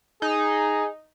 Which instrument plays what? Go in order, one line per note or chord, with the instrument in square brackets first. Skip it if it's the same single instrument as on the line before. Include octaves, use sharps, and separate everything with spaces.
[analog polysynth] D#4 [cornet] G#4